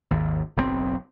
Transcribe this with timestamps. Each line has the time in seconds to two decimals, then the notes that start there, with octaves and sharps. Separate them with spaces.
0.11 G#1 D#2
0.56 F#1 B1 C#3 C4